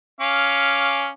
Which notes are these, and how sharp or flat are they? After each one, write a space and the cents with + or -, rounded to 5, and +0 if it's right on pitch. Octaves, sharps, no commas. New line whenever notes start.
C#4 +5 F5 +0 D6 +0